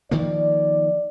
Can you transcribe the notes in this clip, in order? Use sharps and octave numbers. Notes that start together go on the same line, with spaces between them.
D#3 F3 A#3 D5